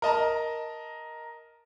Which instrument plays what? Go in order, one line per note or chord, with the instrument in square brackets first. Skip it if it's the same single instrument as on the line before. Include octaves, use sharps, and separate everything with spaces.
[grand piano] A#4 D#5 A5 A#5